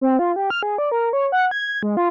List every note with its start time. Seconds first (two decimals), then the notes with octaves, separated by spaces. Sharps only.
0.01 C4
0.19 F4
0.36 G4
0.50 F6
0.63 G#4
0.78 D5
0.92 A#4
1.13 C#5
1.32 F#5
1.51 G#6
1.83 G#3
1.97 F4